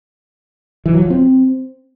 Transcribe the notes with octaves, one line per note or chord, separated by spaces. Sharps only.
E3
F#3
F3
C4